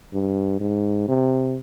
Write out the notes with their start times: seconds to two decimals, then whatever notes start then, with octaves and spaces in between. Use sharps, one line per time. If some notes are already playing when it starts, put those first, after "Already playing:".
0.13 G2
0.60 G#2
1.08 C3